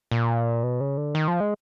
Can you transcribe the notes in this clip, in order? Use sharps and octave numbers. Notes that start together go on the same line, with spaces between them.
A#2
B2
C#3
D3
D#3
F3
G#3